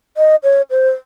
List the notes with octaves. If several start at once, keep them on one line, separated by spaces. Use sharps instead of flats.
D#5
C#5
C5